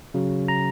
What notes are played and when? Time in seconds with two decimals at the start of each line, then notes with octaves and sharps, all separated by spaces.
0.14 C#3 F#3
0.48 A#5